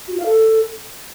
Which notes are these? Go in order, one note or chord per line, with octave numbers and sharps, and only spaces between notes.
F#4
F4
F5
A4